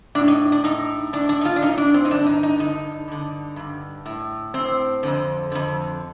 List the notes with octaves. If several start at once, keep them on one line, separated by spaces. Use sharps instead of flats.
A2 D4
D#4
D4
A2 D#4
A2 D4
D4
D#4
F4
D4
A2 D#4
D4
C4
D#4
G2 D3 D4
D#4
D#4
G2 D3 D#4
G2 D3
G2 D3
A2
A2 C4
F2 D3
F2 D3